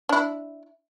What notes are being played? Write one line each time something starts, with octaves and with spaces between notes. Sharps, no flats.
D4 E4